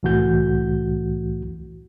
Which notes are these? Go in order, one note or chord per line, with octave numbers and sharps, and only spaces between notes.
C2 A2 E3 A3 F#4 G6